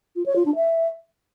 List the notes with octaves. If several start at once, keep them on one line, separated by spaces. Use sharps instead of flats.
F4
C#5
F4
D4
E5